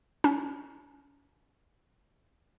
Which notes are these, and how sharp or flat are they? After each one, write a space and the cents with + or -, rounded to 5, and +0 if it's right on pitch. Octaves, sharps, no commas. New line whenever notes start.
C#4 +25